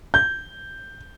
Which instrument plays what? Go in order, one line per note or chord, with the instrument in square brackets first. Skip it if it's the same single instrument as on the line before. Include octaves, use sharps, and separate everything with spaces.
[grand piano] G6